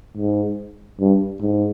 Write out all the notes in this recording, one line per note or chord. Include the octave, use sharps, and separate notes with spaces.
G#2
G2
G#2